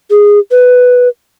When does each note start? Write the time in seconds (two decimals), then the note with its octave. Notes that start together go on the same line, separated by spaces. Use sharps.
0.10 G#4
0.51 B4